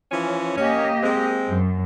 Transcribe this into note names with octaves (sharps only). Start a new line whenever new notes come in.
E3 F3 C#4
A#3 C#4 G4 D#5
G#3 C4
F#2